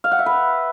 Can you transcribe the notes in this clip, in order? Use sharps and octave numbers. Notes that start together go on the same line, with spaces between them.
F5
F#5
E5
B4